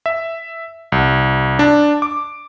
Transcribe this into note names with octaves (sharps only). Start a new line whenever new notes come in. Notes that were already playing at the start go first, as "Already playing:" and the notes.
E5
C2
D4
D6